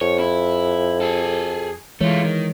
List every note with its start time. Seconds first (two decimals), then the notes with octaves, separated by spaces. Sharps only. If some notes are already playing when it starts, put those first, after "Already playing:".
0.01 F2 C#5
0.19 E4
1.01 G#4 A4
2.01 E3 G#3 A3 F4 C#5
2.24 D#3